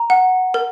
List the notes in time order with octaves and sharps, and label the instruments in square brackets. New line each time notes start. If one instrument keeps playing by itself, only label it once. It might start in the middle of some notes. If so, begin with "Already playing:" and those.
Already playing: [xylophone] A#5
F#5
A#4